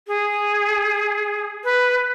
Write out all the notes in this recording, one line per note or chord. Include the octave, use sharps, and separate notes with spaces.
G#4
B4